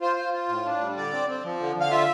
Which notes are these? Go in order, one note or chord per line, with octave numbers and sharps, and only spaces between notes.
F4 C5
F4
F4
A2
D4
G3
D3 D5
C4
C4
F3
D3
D3 F5
F4 E5